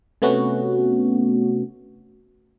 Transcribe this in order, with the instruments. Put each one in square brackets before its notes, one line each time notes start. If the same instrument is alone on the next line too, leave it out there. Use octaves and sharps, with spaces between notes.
[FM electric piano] C3 A3 B3 C#4 F#4